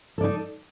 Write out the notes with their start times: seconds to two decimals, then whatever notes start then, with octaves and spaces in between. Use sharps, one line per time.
0.18 A4
0.21 D5
0.24 D#4